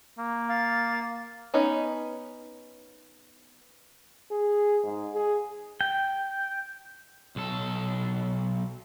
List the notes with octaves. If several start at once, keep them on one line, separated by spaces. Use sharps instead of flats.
A#3
F5 A6
B3 C#4 D#4
G#4
G#2
G#4
G5
B1 A4